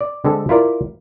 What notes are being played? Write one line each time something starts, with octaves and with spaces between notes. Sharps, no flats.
D5
D3 G#3 C4 A4
E4 F4 A#4 D5